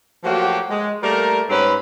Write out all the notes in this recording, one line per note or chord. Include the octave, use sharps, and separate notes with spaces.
F3 F#3 A3 A#3 F#4 G4
G#3
G3 A3 A#3 A#4
G#2 G3 C4 C#4 B4